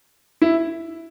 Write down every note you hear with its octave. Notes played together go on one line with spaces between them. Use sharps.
E4